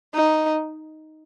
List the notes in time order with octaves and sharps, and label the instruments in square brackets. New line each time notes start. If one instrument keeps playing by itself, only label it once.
[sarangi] D#4